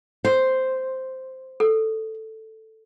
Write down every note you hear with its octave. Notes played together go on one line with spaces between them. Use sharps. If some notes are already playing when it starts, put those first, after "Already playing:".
C5
A4